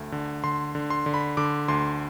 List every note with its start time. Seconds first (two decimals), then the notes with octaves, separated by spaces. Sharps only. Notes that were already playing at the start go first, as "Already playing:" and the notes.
Already playing: D2 A3
0.12 D3
0.44 D3 C6
0.75 D3
0.90 C6
1.06 D3
1.14 B5
1.37 D3 D6
1.68 D2 C6